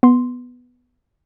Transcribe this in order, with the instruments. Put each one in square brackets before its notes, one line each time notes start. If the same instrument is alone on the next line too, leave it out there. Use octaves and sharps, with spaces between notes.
[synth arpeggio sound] B3 C6